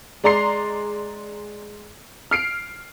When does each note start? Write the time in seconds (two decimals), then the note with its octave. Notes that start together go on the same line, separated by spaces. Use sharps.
0.24 G#3 D5 A#5 C6 C7
2.31 F6 C7 D7